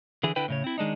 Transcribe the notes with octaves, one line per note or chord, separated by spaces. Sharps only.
D3 E3 E4 G#4
D3 E4 B4 G5
A2 C#3 C#5
C4 E4
D#3 G#3 D4 D#4